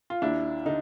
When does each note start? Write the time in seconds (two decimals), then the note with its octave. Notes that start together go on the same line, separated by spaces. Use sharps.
0.10 F4
0.22 D#2 D4 E4
0.66 D3 D#4